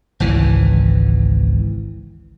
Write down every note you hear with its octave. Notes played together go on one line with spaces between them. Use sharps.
G#1 C#2 E3